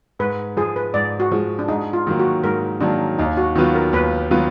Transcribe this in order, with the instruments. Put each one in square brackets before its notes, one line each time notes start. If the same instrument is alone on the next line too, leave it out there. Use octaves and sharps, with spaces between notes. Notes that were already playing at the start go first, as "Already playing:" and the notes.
[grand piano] G#2 [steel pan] B4
[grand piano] F3 G#3 [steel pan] G#4
[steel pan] B4
[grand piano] G#2 [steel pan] D5
[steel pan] F#4
[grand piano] F3 G#3
[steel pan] D4
[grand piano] G#2 [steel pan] D#4
[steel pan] F4
[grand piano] D#3 F#3 A#3
[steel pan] F#4
[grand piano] G#2 [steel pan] A#4
[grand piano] D#3 F#3 A#3 [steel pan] D4
[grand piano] D#2 [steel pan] D#4
[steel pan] F#4
[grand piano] D#3 F#3 B3 F4 [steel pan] F#4
[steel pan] A#4
[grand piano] D#2 [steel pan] B4
[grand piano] D#3 F#3 B3 F4